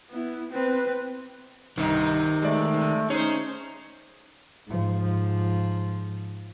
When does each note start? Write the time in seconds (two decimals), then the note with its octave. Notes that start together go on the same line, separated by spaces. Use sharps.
0.11 B3 E4
0.51 C4 B4
1.78 C2 G2 C3 D#3 D#4
2.42 G#3 A3 D5
2.73 C3
3.10 C#4 D#4 G#4 C5 C#5
4.68 G#2 F3